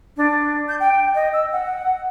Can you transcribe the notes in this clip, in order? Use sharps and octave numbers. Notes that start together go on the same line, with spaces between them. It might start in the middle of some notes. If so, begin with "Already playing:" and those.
D4
G6
G5
D#5
E6
F#5